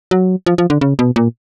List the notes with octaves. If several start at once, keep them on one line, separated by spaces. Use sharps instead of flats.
F#3
F3
F3
D3
C#3
B2
A#2